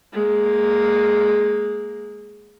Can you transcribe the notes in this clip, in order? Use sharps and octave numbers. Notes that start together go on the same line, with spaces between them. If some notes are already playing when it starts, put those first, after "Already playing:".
G#3 A#3